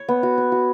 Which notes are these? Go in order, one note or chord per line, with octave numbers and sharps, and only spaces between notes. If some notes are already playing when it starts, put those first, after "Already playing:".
Already playing: C#5
B3
F#4
C#5
F#4